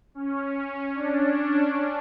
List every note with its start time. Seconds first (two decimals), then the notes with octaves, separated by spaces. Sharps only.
0.15 C#4
0.95 D4